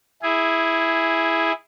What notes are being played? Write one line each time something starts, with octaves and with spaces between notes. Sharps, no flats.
E4 G#4